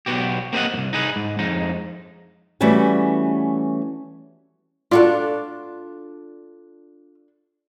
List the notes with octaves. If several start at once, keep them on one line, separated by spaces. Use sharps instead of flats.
B1 B3 F#4 G4
A#3 C4 G4 C#5 D#5 F#5
C2 G2
D#4 G#4 B4
G#2
F2 G#3 D#4
E3 G3 A3 B3 C#4 F#4
D4 F4 F#4 A4